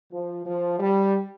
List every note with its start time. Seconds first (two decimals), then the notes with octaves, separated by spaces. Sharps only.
0.12 F3
0.46 F3
0.80 G3